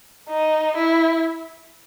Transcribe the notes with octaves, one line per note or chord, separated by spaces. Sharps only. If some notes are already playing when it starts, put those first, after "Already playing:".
D#4
E4